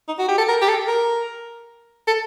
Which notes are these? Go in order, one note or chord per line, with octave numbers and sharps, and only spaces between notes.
D#4
F#4
G4
A4
A#4
G4
A4
A#4
A4